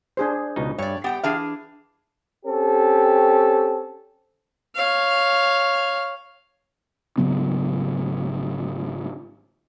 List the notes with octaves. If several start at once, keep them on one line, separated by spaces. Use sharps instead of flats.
D4 G#4 C5
C#2 B2 D#4
G2 C#5 D5
B3 G4 F#5 G5
E3 D4 G#4 F5
C4 C#4 G4 A4
C#5 F5
G#1 C#3 F#3 B3